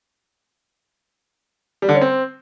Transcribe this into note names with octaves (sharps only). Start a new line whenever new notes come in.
G3
D3
C#4
C4